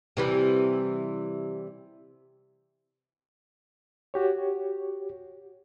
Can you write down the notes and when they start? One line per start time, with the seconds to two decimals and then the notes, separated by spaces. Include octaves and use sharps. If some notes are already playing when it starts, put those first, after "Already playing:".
0.17 C3 E3 G3
4.14 F#4 G4 C#5